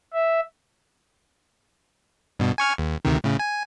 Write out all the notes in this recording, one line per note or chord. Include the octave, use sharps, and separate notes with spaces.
E5
G2 B2
G#5 C#6 F6
D#2
D2 C3 D#3
A2 C#3
G#5